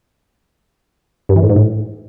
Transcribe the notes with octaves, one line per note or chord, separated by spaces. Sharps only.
G2
E3
A2
G#2
A2